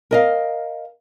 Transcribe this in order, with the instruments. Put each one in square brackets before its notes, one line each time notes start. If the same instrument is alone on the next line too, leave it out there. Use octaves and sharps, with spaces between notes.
[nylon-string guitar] A#4 D#5 F5